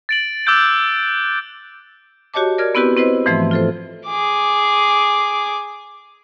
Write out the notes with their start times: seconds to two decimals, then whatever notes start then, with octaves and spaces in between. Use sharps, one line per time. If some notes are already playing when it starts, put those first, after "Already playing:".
0.09 A6 D7 F#7
0.46 D6 E6 F#6 G6 D7
2.34 F#4 G4 C#5 D#5 A5 D6
2.58 A#4 D5 F6 G#6
2.75 B3 C4 E4 F#4 G4 B4
2.97 C4 E4 B4 C5 D#5
3.26 G#2 E3 F3 A3 E5 C6
3.51 F4 A4 C5
4.07 G#4 D6